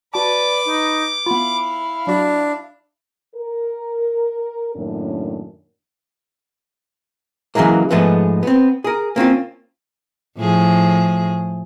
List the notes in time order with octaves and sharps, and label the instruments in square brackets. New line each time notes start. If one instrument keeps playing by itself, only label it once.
[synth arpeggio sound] F#4 A5 [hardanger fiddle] B4 [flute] D5 [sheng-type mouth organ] D6
[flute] D#4
[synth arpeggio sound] B3 F4 [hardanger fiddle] E4 F5 [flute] B5
[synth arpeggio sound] F#3 F#4 [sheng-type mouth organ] D4
[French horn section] A#4
F#2 A2 D#3 A#3 C#4 D4
[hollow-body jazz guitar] C#3 E3 F#3 G#3 A#3
G#2 F3 G#3 A3 B3
B3 C4
G#4 A#4
A#3 C4 C#4 F4
[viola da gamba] A2 F3 G#4